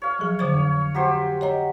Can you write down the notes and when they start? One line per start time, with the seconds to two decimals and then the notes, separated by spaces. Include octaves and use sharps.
0.02 C#5 F5
0.19 F3 F#3 G#4
0.39 D3 C5 C#5 G#6
0.54 F2
0.94 F#3 G4 C5
1.41 C#5 D#5 A#5